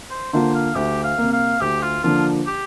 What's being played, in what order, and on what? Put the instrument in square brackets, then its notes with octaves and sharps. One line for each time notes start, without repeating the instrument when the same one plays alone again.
[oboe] C5
[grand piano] D3 A#3 F4 [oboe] C5
[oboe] F5
[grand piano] D2 [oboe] G4
[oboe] F5
[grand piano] C3 A#3
[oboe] F5
[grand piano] D2 [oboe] G4
[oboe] F4
[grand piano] D3 F3 A#3 D4 [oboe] F4
[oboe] G4